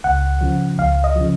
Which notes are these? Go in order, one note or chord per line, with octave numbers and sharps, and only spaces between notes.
C#2 F#5
C#3 F3
C#2 F5
D#5
C#3 F3